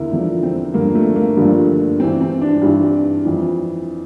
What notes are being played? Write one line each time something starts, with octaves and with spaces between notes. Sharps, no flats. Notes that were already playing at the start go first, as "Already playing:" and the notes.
Already playing: E2 D3 E4 A#4
E2 D3 F3
C4
G2 D3 F3 A#3
A3
A#3
G2 D3 F3
G2 E3 C4
C4
D4
G2 E3
F2 E3